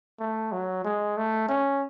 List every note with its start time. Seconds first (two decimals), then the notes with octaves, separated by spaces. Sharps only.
0.20 A3
0.52 F#3
0.85 G#3
1.17 A3
1.49 C#4